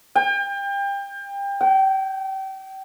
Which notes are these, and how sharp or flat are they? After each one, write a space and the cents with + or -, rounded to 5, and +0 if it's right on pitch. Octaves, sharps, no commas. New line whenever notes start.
G5 +30
G5 -30